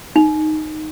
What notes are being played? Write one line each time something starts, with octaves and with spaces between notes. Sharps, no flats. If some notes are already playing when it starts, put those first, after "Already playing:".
D#4